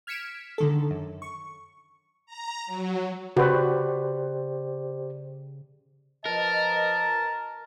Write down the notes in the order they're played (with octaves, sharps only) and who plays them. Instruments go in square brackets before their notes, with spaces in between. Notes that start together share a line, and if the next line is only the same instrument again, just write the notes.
[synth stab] F6 G#6 B6 C#7 D7 E7
D3 D#3 A4
F#2
C#6
[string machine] A#5
F#3
[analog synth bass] C#3 [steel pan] F#4 B4 [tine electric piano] G4 C5 D5
[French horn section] F3 B4 D#5 [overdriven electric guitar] A#4 [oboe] A5